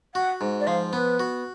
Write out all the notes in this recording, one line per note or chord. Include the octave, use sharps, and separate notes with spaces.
F#4 F#5
G#2
D5
F3 F5
B3 B4
F#4